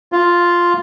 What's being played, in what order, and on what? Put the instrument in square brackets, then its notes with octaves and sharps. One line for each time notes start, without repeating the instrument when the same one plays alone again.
[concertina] F4